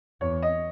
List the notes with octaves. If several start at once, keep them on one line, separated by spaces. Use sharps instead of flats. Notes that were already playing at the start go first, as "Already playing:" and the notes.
E2 C#5
D#5